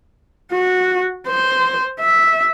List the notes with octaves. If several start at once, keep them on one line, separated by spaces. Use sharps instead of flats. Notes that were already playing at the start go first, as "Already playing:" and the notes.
F#4
C5
E5